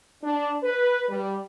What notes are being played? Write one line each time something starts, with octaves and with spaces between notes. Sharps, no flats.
D4
B4
G3